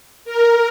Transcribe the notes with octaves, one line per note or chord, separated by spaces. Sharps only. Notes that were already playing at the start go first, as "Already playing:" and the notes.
A#4